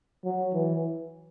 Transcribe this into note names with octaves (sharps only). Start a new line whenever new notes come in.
F#3
E3